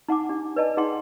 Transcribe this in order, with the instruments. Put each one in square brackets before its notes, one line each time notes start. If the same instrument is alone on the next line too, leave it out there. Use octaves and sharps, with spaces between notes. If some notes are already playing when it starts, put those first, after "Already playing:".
[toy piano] D#4 F#5 G#5 D6
D4 G4
B4 D5 D#5 G#5 A5
D#4 G#4 F#5 G5 C6